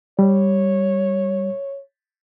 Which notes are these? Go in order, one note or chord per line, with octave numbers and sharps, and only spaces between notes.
G3 C#5